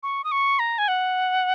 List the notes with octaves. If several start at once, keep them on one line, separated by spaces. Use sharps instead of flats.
C#6
D#6
C#6
A#5
G#5
F#5